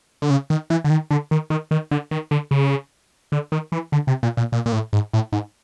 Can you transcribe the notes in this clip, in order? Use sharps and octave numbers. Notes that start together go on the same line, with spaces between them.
D3
C#3
D#3
E3
D3
D#3
D3
D#3
D#3
D#3
D3
D#3
D3
C#3
D3
D#3
E3
D3
C3
A#2
A#2
A#2
A#2
A2
G#2
A2
G#2